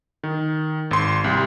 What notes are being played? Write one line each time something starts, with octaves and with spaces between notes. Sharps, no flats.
D#3
G#1 C6
C2 G3